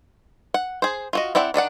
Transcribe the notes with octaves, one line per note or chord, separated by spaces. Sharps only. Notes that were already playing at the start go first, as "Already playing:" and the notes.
F#5
G#4 C5
F4 F#4 D#5
C4 E4 D5 F#5
D#3 D4 D5 F#5